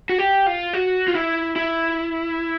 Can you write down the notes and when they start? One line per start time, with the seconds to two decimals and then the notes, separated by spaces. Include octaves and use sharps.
0.09 F#4
0.18 G4
0.46 F4
0.74 F#4
1.08 F4
1.15 E4
1.56 E4